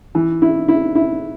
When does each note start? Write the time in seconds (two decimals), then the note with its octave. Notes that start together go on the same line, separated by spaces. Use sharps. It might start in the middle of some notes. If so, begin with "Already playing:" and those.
0.15 E3
0.42 E4
0.68 E4
0.95 E4